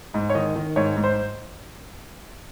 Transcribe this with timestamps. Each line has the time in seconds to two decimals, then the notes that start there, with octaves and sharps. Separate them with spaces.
0.14 G#2
0.30 C#5
0.35 D#3 D#5
0.55 D#3
0.76 G#2 C#5
0.97 G#2
1.04 C5